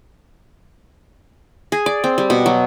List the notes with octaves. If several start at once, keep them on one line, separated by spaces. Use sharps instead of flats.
G#4
D5
C4
G3
B2
F#3